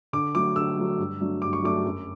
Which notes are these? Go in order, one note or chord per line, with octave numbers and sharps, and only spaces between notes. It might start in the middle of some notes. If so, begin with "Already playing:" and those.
D3 D6
F#3 A3 D6
D3 E6
F#3 A3
G2
F#3 A3 D4
G2 D6
C#6
F#3 A3 D4 D6
F#2